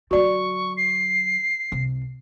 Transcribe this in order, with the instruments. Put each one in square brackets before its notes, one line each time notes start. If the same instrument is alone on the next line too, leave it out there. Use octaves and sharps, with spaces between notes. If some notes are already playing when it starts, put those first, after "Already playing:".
[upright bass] D3 F#3 [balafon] F#4 D5 [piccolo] C#6
[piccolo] C7
[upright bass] C2